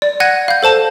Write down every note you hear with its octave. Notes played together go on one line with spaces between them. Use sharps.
D5
F#5 F#6 G#6 A#6 D#7
F5 G6
A4 C5 A5 E7